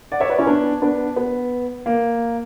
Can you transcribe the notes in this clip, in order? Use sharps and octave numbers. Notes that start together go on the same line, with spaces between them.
D5 F#5
C#5 E5
B4 D5
C#4 E4
B3 D4
B3 D4
B3
A#3